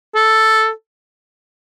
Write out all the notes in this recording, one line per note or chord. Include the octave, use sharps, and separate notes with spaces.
A4